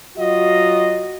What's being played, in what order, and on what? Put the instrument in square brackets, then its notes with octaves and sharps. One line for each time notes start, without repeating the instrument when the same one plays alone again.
[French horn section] F#3 F4 F#4 D#5